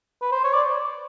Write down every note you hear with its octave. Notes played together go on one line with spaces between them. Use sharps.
B4
C5
C#5
D5